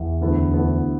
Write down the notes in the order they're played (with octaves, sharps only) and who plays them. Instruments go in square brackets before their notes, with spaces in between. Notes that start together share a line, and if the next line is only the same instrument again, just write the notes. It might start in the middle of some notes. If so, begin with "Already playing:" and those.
Already playing: [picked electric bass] E2
[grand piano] D2 D3 B3 E4
D2 D3 B3 E4